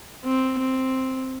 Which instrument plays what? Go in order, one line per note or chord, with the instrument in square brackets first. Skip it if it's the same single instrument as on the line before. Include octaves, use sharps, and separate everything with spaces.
[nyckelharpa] C4
C4